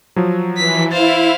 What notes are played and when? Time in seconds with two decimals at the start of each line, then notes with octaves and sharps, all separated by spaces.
0.16 F3 F#3
0.57 E3 B6
0.91 E4 C5 F5 A6